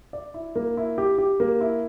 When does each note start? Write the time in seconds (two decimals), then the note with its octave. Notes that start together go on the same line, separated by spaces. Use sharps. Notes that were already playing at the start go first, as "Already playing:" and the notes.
0.13 D5
0.34 E4
0.56 A#3
0.77 E4
0.98 G4
1.18 G4
1.40 A#3
1.61 E4